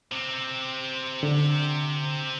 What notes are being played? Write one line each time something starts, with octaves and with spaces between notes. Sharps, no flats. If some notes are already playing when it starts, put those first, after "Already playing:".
C3 C4
D3